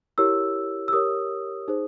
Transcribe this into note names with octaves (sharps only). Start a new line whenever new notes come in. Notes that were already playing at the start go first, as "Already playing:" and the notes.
E4 G4 A#4 C#5 E6
E6
G4 A#4 C#5 D#6
D#4 G#4 C5